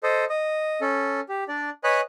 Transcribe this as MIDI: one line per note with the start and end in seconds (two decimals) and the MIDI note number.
0.03 0.25 69
0.03 0.25 72
0.03 0.25 75
0.29 0.80 75
0.81 1.20 61
0.81 1.20 69
1.29 1.44 67
1.48 1.70 62
1.48 1.70 74
1.84 2.01 71
1.84 2.01 73
1.84 2.01 75
1.84 2.01 80
1.84 2.01 83
1.84 2.01 90